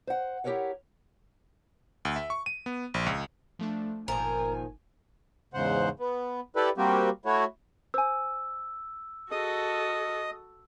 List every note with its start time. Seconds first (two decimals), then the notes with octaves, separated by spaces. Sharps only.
0.07 C5 F#5
0.44 E4 G4 A4 A#4 C#5 F#5
2.05 D2
2.16 E5
2.30 C#6
2.46 D#7
2.66 B3
2.94 A#1
3.06 C#2
3.59 F3 A3 D4
4.08 G1 A#2 D#3 F3 A#4 G#5
5.54 E2 G#2 C#3 C5 F#5
6.00 B3
6.56 E4 G4 A4 B4 D5
6.78 G3 A#3 C4 F#4 G4
7.25 A3 E4 F#4 C#5
7.94 C5 G#5 E6
9.31 F#4 G#4 A4 D#5 D#6